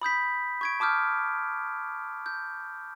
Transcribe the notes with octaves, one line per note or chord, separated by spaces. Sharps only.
B5 D#6 G6 B6
C#6 G#6 D7
A5 D6 D#6 F6 G6
G6